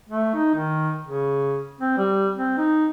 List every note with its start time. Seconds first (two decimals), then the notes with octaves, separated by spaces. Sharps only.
0.09 A3
0.35 D#4
0.55 D#3
1.05 C#3
1.80 C4
1.97 G3
2.37 C4
2.58 D#4